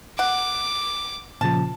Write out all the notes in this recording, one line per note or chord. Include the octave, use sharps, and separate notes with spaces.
F#5 D6
A#2 C#3 F3 A5